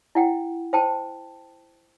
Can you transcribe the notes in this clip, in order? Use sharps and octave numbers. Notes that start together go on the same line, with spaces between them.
E4 F#5 G5
C5 G5 A5